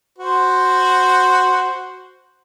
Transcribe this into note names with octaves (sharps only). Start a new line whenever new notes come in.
F#4 C5